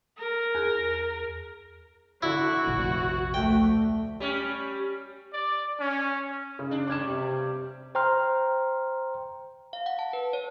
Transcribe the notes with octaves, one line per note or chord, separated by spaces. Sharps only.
A#4
E2 G#4 F#6
D3 E4 F#4
F1 A#1
D2 A3 G5
G3 C#4
D5
C#4
C#3
D4
G2 G3 D6 G#6 E7
C3
C5 G5 A#5 C6 F6
F5
F#5
A5
B4
C#5